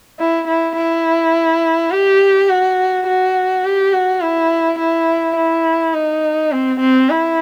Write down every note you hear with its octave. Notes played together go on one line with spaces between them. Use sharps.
E4
E4
E4
G4
F#4
F#4
G4
F#4
E4
E4
E4
D#4
C4
C4
E4